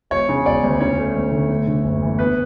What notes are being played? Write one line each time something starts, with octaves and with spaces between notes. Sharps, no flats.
E1 C#5
C#3
E1 D5
D2
C#4 C#5
A3
D2
D3
A3
D3
F#1
E2
B3 B4